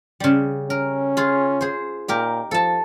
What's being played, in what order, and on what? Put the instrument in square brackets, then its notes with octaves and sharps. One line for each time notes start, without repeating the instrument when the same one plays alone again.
[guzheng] C#3 G3
[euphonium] C#4 [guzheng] A#4
[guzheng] F4 G#4
G#4 C5
[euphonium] A#2 [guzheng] D#4 G4 A#4
[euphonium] F3 [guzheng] A4 A5